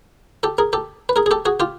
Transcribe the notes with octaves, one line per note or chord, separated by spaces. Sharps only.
G4 A4
G#4 A#4
G4 A4
B4
G#4 A#4
G#4
G4 A4
F#4 G#4
F4 G4